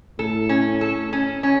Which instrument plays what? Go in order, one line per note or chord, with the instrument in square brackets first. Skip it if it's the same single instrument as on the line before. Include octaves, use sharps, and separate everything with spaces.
[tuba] A2 [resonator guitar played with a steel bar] A4
[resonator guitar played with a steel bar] C#4
A4
C#4
C#4